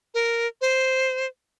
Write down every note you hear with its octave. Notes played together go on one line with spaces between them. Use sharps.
A#4
C5